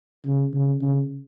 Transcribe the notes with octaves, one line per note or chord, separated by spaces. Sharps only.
C#3
C#3
C#3